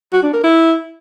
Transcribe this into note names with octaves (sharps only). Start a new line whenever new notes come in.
F#4
D4
A#4
E4